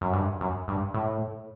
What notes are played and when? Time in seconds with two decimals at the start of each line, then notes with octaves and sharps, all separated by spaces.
0.01 F#2
0.13 G2
0.41 F#2
0.68 G2
0.94 A2